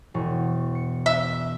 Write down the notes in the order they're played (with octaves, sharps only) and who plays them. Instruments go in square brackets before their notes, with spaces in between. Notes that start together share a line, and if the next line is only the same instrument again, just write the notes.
[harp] E1 C#6
C#7
[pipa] E5